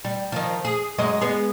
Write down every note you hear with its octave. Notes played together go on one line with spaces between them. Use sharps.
G3
D#3 F3
G#4
F#2 G#3 D#5
G#3 B3 G#4